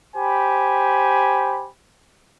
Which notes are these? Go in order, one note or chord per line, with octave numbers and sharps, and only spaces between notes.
G4 C5 G#5 B5